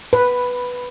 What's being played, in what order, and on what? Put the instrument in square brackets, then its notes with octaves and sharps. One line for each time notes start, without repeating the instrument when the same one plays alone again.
[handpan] B4